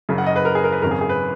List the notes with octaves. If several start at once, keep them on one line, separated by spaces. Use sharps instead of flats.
F#1 F#2 C#3
F#5
D#5
B4
A#4
G#4
A#4
B4
G#1 F#2 C#3 A#4
G#4
G#4
B4